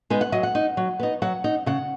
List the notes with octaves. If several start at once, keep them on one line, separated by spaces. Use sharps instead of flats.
G#3 B3 D#4 G#5
F#5
F#3 D#5
F#5
D#4
F#3
B3 D#4
F#3 F#5
D#4
C#3 F#5